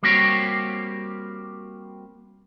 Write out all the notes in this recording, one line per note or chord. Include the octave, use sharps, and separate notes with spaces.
G3 A#3 C4 F#4 G4 C#5